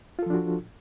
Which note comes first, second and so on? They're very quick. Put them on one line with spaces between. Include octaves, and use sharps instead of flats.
F4 A4 F3 D4 F#4